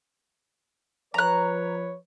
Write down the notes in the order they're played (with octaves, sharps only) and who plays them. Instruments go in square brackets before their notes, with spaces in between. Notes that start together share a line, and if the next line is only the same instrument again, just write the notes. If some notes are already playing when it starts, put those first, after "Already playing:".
[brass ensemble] F3 B4 C#5 [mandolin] A#5 F#6